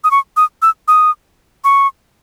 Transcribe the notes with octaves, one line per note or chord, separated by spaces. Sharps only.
D#6
C#6
D#6
E6
D#6
C#6